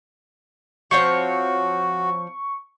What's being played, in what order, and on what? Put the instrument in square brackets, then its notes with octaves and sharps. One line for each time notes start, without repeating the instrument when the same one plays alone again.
[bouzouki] F3 C4 C#5 [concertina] F#4 [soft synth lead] C#6